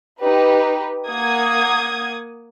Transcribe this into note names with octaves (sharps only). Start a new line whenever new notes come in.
D#4 G4 B4
A#3 F#5 D#6 G#6